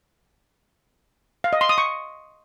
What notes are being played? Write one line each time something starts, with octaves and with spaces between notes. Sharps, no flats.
F5
D#5
C6
D#6
C#6